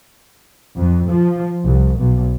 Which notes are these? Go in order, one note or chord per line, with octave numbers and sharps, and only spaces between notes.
F2
F3
C2
B1